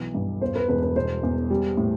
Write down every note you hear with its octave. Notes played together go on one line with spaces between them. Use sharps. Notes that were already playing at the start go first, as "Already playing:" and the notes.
Already playing: B1 E3
G2
E2 C5
B4
E1 B4
B4
B2 C5
E2
G3
A2